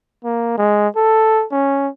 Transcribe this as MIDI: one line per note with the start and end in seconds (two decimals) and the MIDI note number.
0.24 0.53 58
0.58 0.88 56
0.96 1.45 69
1.51 1.89 61